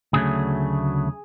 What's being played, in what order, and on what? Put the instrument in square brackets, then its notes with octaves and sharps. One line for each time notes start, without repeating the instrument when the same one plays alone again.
[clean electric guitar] D2 C#3 F#3 A3 G#4